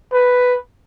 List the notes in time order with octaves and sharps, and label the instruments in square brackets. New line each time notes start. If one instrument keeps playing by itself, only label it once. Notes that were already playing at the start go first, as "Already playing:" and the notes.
[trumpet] B4